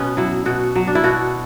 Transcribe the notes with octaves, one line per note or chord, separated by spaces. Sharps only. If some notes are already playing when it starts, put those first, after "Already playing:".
Already playing: B2 B3 C#4
F#3 E4
B2 F#4
F#3
D4
E4
B2 F#4